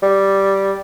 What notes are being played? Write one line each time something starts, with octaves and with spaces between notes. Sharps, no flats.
G3